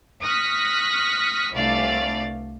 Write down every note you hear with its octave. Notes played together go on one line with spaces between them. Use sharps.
C#6 D#6 F6 F#6 A#6 B6
G1 C2 A3 D5 F5 A6